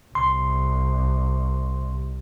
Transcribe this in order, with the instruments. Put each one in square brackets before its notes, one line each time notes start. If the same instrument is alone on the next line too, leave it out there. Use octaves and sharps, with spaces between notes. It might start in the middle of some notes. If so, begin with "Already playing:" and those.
[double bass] C2 [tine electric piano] C6